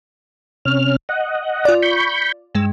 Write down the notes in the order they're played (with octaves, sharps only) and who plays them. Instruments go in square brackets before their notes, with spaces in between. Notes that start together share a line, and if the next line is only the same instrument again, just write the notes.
[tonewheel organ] C3 C#4 F6
D#5 F#5
[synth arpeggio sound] F4 D5
[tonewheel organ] B5 C#6 G6
[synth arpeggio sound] G2 G#3 [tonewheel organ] E6